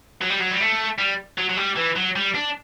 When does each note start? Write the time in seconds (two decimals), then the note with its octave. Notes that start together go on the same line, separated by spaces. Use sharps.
0.22 F#3
0.30 G3
0.40 F#3
0.51 G3
0.61 A3
0.98 G3
1.38 F#3
1.50 F#3
1.57 G3
1.77 E3
1.96 F#3
2.16 G3
2.35 D4